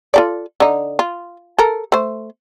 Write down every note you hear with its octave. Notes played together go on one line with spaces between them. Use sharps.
F4 A4 D5
D3 D#4
F4
A4 A#4
A3 C5